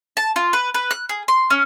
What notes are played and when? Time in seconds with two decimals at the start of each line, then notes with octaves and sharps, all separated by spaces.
0.17 A5
0.36 F4
0.53 B4
0.74 B4
0.91 F#6
1.09 G#4
1.28 C6
1.50 C#4